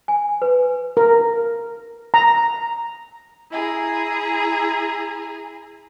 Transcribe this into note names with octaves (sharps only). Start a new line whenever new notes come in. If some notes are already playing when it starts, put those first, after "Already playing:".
G#5
B4
A#4
A#5
E4 G#4 A#5